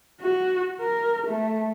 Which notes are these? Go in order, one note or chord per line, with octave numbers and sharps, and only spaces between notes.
F#4
A#4
A3